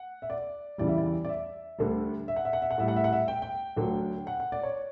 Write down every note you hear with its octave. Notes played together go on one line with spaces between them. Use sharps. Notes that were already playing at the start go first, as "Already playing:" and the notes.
Already playing: F#5
E5
D5
E2 C#3 E3 G3 D5
E5
D5
D5
E5
D2 D3 G3
E5
F#5
E5
F#5
E5
F#5
A2 G3 E5
F#5
E5
F#5
E5
G5
G5
D2 D3 F#3
F#5
F#5
D5
C#5